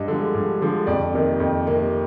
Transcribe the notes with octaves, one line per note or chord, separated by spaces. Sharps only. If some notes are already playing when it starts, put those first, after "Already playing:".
Already playing: G2 D#5
D3 F3 G#3
G2
D3 F3 G#3
F2 D5
C3 D#3 A#3
F2
C3 D#3 A#3